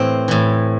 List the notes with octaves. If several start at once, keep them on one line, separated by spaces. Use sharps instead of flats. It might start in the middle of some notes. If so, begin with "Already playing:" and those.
Already playing: A2 E3 C4
A2 E3